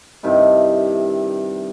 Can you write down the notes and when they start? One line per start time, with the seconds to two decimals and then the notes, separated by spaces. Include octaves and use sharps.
0.23 G2 C3 D#3 E4